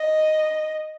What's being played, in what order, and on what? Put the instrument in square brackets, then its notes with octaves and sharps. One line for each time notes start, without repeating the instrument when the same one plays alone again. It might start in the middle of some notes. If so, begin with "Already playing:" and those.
Already playing: [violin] D#5